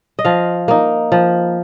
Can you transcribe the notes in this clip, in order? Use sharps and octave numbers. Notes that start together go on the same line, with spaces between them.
D#5
F3 F5
A#3 D#4
F3